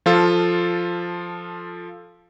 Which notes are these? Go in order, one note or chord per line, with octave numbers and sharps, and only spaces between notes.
F3 F4 A4